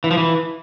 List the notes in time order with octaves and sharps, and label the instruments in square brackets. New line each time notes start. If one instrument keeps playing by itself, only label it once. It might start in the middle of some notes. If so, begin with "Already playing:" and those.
[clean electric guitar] E3
F3
E3